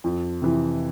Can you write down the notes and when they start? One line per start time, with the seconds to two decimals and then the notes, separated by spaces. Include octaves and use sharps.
0.04 F2
0.42 C3 E3